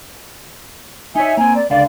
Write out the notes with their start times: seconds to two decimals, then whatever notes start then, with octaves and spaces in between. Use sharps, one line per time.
1.16 D#4 C#5 E5 G#5
1.37 A#3 C4 G#5
1.55 D5
1.70 C#2 D3 D5 F5